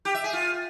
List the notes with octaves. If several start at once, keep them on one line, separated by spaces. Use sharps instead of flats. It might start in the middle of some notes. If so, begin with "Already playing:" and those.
G4
E5
G#4
F4